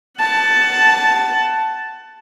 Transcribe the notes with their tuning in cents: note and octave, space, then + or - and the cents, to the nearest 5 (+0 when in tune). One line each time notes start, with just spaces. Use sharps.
F#5 +20 A5 +0